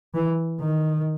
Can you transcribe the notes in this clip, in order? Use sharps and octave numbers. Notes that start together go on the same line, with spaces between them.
E3
D#3